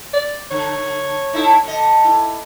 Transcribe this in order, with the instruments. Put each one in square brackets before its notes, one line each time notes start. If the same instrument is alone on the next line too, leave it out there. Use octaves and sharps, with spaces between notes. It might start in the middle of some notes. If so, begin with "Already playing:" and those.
[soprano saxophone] D5
[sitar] D3 [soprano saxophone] C#5
[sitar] D#4 E4 A4
D3 D#5
E4